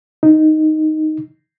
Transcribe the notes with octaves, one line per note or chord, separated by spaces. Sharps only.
D#4